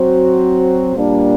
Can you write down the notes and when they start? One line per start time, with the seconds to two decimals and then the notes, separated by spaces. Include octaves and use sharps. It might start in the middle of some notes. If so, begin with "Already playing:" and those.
Already playing: F#3 C4 F#4 C5
0.96 A#2 G3 A#3 D4